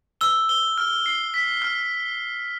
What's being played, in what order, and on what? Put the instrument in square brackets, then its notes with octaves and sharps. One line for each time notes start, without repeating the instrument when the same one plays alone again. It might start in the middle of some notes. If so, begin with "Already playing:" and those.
[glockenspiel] E6 [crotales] G7
[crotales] G7
F6
C7
B6
F6